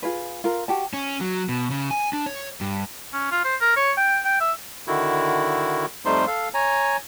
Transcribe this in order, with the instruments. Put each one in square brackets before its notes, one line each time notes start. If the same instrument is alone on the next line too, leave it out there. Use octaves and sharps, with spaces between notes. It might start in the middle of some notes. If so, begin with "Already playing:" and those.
[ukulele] F4 G#4 B4
F4 A#4
F#4 G4 A5
[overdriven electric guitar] C#4
F#3
B2
C#3
G#5
D4
C#5
G2
[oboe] C#4
F4
C5
A#4
C#5
G5
G5
E5
[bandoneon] D3 D#3 E4 F#4
F2 G3 A3 D#4 C5 C6
A4 F5
C#5 G#5 A#5